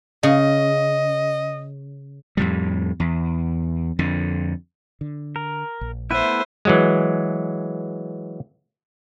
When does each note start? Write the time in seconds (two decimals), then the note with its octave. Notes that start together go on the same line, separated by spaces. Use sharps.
0.23 C#3 D#5
2.37 F2 A2 G3
3.00 E2
3.99 F2 D3
5.01 D3
5.36 A#4
5.81 A#1
6.11 A3 B3 E4 C5 E5 B5 F#6 D#7
6.65 E3 F#3 G#3